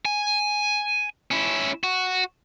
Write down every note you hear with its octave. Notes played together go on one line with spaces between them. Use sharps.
G#5
C#4 E4
F#4